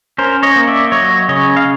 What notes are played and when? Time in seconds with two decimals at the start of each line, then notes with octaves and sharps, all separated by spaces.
0.18 C#4 A#4 C5
0.43 C#5 D#5
0.56 A#3
0.67 D5 E5
0.92 F#3 C#5 D#5
1.29 C#3 C#5 D#5
1.57 F5